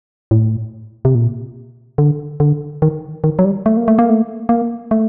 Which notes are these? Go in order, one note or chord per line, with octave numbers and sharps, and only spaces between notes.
A2
C3
A#2
D3
D3
D#3
D#3
F#3
G3
A3
A#3
A3
A#3
A3
A#3
A3